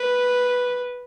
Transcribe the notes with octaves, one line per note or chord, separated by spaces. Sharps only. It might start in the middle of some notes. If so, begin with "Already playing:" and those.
Already playing: B4